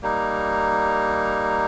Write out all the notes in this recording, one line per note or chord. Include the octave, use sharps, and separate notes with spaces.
G3 A#3 D#4